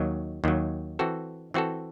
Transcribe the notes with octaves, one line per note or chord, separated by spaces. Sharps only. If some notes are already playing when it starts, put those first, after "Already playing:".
Already playing: D#2 D#3 F#3
D#2 D#3 F#3
E3 C4 F#4 A4
E3 C4 F#4 A4